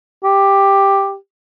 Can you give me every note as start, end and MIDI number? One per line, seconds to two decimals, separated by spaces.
0.24 1.15 67